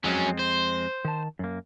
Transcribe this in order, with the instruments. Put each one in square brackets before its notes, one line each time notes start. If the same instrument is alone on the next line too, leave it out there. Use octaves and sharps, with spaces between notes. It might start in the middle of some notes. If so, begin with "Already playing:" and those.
[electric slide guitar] F2 G#3 C4 [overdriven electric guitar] F#3 C#4
[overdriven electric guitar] C5
[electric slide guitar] D#3 A5
F#2 A#3